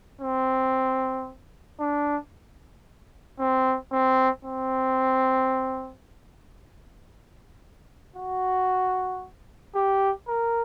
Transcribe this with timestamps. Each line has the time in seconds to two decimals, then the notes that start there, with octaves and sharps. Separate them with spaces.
0.21 C4
1.80 D4
3.39 C4
3.92 C4
4.45 C4
8.16 F#4
9.75 G4
10.28 A#4